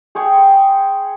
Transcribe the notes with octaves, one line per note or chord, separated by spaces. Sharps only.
G#4 C5 C#5 G5